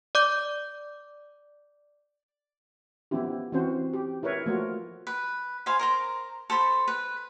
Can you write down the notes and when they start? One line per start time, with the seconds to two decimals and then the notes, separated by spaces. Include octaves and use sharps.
0.15 D5 D6 G6
3.11 F3 B3 C#4 E4 G4
3.52 E3 C4 C#4 F#4 C5
3.93 G4
4.23 E4 A#4 B4 C#5
4.46 F3 A3 A#3 F4 F#4 A#4
5.07 B4
5.66 C5 F5 G#5 B5
5.79 A#4 C5 A#5
6.50 A4 C5 B5
6.88 B4